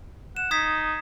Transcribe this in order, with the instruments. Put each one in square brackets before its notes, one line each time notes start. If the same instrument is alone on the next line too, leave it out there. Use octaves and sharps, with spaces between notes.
[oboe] F#5 [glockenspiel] E7
[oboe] D#4 [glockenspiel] D#6 G#6 B6